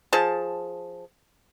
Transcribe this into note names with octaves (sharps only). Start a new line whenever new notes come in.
F3 G#4 A5